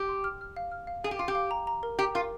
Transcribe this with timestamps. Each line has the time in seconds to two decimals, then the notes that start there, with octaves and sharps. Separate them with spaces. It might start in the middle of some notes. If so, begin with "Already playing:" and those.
Already playing: G4
0.09 C6
0.24 F6
0.41 F6
0.56 F5
0.72 F6
0.87 F5
1.04 G#4 F5
1.11 G4
1.19 F4 C6
1.28 G4
1.35 F5
1.51 A#5
1.67 A#5
1.83 A#4
1.99 G4 A#5
2.15 F4 A#4